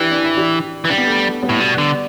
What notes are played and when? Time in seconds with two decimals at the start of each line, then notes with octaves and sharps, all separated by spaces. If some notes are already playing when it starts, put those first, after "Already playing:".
Already playing: E3 D4 G4
0.11 D4
0.24 E4
0.37 D4 G4
0.85 E3
0.90 G3 D4
0.98 B3
1.07 A3 D4
1.42 G3 B3
1.49 A2
1.60 B2
1.78 D3